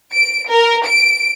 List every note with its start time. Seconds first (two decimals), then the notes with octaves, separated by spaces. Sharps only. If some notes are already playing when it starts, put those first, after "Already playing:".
0.13 D7
0.50 A#4
0.85 D7